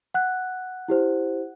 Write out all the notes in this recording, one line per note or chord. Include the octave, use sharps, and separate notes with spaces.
F#5 F#6
E4 G4 C5